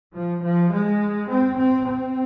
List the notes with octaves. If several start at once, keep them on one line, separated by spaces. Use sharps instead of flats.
F3
F3
G#3
C4
C4
C4